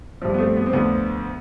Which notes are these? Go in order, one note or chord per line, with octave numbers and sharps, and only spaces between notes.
G2 F3
B3
A3 C4
B3
C4
D2 D3 F3 B3